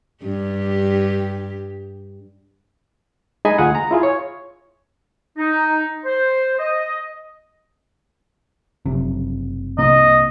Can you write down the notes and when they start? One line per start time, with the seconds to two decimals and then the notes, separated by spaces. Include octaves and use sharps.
0.23 G2 G4
3.45 G#3 D#4 G#4 D#5 G#5 B5
3.58 D2 F4 G#4 F#5
3.75 A#5
3.91 E4 F4 G#4
4.03 C#5
5.37 D#4
6.04 C5
6.59 D#5
8.86 F#1 C3
9.78 C2 C3 A#3 D#5